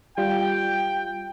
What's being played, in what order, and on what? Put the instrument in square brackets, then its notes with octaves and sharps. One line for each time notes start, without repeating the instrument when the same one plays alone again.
[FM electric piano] G3 F4 [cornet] G5